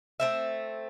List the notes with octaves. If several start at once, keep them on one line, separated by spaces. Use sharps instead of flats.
A3 C4 E5